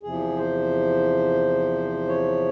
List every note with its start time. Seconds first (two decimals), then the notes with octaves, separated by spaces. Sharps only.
0.03 E2 C3 F3 G#4
0.37 C5
2.08 C#5